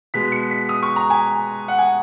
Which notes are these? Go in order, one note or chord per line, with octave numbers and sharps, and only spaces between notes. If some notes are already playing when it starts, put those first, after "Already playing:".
B2 G#3 B3 B6
C#7
B6
D#6
C#6
A#5
G#5
F#5
G#5